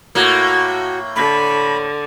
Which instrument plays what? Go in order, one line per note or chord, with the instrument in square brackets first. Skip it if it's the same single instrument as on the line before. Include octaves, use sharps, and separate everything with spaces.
[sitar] A2 A#3 [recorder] F#4
[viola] D3 [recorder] B5